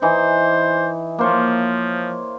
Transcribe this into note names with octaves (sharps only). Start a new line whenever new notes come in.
E3 D#4 C5
F3 A#3 C5 C#5